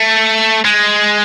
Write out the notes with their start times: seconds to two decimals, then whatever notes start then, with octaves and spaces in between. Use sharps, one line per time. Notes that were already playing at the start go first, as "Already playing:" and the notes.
Already playing: A3
0.65 G#3